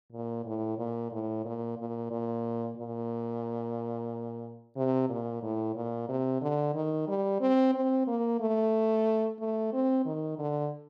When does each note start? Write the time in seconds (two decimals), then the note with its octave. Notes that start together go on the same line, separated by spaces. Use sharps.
0.12 A#2
0.45 A2
0.78 A#2
1.12 A2
1.45 A#2
1.78 A#2
2.11 A#2
2.77 A#2
4.76 C3
5.09 A#2
5.42 A2
5.76 A#2
6.09 C3
6.42 D3
6.74 D#3
7.08 G3
7.40 C4
7.74 C4
8.07 A#3
8.40 A3
9.40 A3
9.73 C4
10.06 D#3
10.38 D3